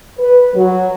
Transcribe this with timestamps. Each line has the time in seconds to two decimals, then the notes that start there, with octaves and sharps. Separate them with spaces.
0.19 B4
0.55 F#3